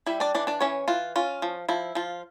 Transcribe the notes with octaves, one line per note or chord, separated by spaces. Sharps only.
G3 E4 E5
D4 D5
E3 D4 D5
D4 D5
E3 C#4 C#5
E3 F4
C#4 F4
F3
F3 E4
F3 F4